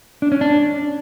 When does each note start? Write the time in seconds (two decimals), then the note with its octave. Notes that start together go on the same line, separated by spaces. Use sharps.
0.22 D4
0.32 C#4
0.41 D4